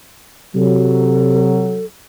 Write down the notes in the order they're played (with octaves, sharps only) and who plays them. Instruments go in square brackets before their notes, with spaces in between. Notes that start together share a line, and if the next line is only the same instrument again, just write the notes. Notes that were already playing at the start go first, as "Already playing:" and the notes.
[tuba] C3 [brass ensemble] F#3 [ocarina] A4